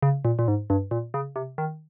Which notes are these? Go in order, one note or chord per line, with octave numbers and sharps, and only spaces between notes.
C#3
A#2
A#2
G#2
G2
A#2
C#3
C3
D#3